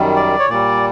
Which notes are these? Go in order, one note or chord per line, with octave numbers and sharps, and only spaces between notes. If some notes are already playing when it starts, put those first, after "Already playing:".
Already playing: F#2 D#3 G3
D5
C#5
A#2 G3 D5